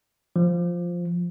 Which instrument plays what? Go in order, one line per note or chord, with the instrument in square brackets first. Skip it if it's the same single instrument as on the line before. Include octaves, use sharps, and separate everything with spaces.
[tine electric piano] F3